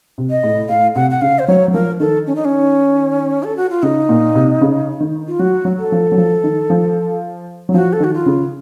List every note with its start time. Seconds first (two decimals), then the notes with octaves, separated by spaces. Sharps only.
0.18 C3
0.30 D#5
0.43 A2
0.69 A2 F5
0.95 C3 F#5
1.11 F#5
1.22 C#3 F5
1.39 C5
1.47 F#3 C#5
1.68 F#3
1.73 F3 A#4
2.00 D#3 A4
2.27 C#4
2.35 D#4
2.45 C#4
3.44 A4
3.57 F#4
3.70 F4
3.83 C#3 D#4
4.09 A#2
4.35 C3
4.61 C#3
5.00 D#3
5.28 F4
5.39 F#3 F#4
5.65 F#3
5.79 A4
5.92 F3
6.12 F#3
6.18 F3
6.44 D#3
6.70 F3
7.69 F#3
7.74 F3 F#4
7.93 A4
8.00 D#3 F#4
8.14 F4
8.26 C#3